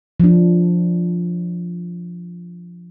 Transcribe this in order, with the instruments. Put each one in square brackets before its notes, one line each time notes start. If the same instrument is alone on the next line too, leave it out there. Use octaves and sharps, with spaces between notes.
[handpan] F3 D4